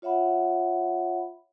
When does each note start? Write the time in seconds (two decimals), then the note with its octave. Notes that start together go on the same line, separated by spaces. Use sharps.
0.02 F4 C#5 E5 F#5 B5